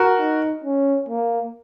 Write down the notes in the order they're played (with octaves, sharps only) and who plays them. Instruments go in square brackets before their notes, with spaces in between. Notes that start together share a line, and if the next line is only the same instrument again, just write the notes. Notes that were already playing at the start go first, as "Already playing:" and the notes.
Already playing: [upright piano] F#4 A#4
[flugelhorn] D#4
C#4
A#3